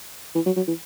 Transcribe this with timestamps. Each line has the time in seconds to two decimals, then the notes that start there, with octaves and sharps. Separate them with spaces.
0.35 E3
0.46 F#3
0.56 F#3
0.67 E3